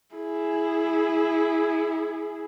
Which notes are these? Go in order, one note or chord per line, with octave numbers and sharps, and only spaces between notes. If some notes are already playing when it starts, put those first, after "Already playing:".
E4 G#4